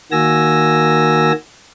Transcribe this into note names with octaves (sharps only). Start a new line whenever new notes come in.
D#3 A#3 F#4 G#5 E6 A#6